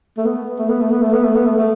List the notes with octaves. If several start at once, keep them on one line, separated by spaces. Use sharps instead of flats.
A3
B3
A3
B3
A3
B3
A3
B3
A3
B3
A3
A3